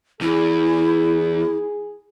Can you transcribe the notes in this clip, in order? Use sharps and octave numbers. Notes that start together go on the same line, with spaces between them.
E2 E4 G#4